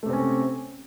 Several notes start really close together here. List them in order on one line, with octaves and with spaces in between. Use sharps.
A3 C3 C4 C#4